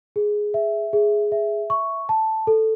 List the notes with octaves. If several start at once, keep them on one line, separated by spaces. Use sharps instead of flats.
G#4
E5
G#4
E5
C#6
A5
A4